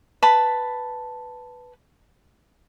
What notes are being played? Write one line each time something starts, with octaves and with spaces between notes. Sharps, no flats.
B4 A5 B5